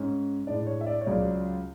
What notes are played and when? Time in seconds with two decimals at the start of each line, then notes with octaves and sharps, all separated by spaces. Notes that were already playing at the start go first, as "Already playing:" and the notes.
Already playing: G#2 G#3 C#4
0.47 A2 G#3 D4 D5
0.67 C#5
0.81 E5
0.86 D5
1.01 C#5
1.06 C#2 C#3 F#3 C#4 D5